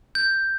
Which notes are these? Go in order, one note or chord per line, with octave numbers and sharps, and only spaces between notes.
G6